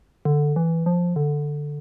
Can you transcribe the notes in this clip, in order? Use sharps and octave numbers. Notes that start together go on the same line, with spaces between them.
D3
E3
F3
D3